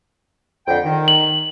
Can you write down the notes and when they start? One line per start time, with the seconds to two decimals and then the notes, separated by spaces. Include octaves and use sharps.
0.67 F2 D3 G5
0.85 D#3
1.08 F#7